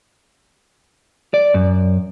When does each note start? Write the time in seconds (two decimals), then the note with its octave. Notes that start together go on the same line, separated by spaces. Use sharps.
1.34 D5
1.54 F#2